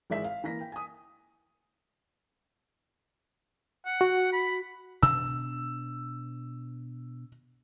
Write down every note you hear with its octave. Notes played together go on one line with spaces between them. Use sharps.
G#1 E3 G#3 D5 E5 B6
F5
E3 A#3 A#6 B6
G5
G#5 D#6
F#5
F#4
B5
B2 D4 E6